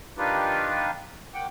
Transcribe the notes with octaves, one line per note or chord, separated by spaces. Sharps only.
D#3 D4 D#4 F4 G4 B4
D#3 F#5 G5 D6